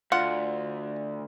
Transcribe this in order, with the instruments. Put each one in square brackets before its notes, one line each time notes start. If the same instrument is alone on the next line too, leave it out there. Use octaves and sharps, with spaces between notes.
[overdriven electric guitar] D2 [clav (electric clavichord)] F4 [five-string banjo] F#5